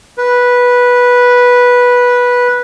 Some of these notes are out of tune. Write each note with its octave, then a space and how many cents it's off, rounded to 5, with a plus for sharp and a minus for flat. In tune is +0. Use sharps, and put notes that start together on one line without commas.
B4 -10